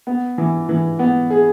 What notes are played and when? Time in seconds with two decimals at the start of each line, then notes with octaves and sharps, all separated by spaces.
0.07 B3
0.38 E3
0.69 E3
0.99 B3
1.30 G#4